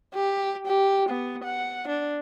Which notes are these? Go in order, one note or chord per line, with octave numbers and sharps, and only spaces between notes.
G4
G4
B3
F#5
D4